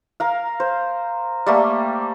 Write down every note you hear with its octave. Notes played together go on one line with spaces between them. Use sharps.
A#4 F5
C5
G3 A3 A#3